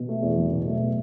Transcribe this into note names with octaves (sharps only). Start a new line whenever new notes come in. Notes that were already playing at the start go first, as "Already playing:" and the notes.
Already playing: B2
A3
E2
F#3
B2
A3